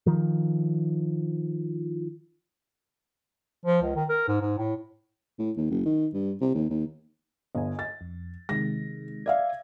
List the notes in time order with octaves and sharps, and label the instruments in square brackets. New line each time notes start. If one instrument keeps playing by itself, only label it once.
[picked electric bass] D#3 F3
[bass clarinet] F3
C#2
D#3
A#4
G#2
G#2
A2
[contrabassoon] A2
D#2
F#1
D#3
G2
C3
D#2
D#2
[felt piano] G1 [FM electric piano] D#5 G#5
[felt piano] A6
[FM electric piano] F2
[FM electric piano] C3 D#3 G#3 [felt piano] A#6
[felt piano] D5 E5 F5 [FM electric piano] G#6